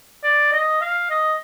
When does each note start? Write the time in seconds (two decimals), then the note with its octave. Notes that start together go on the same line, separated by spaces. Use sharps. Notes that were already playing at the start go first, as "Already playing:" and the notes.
0.24 D5
0.52 D#5
0.81 F5
1.10 D#5